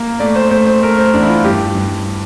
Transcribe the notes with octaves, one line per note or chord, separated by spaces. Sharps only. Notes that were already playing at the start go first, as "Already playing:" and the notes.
Already playing: A#3
A3 D5
C5
A3 C5
C5
A3 A#4
C5
E2 D4
E4
F4
G2 G4
G2